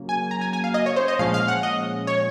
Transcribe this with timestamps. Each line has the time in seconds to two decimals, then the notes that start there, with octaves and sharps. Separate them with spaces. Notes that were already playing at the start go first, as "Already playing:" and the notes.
Already playing: C#3 F#3 A#3 C#4
0.09 G#5
0.31 A#5
0.41 G#5
0.53 G#5
0.64 F5
0.74 D#5
0.86 C#5
0.96 C5
1.08 D#5
1.19 A#2 F3 G#3 C#4 F5
1.34 F5
1.48 F#5
1.63 D#5
2.07 C#5